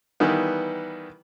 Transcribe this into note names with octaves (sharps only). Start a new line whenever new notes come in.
D#3 E3 G3 B3